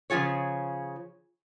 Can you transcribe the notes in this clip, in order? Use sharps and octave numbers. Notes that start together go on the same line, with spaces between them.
C#3 F3 F4 G#4 C#5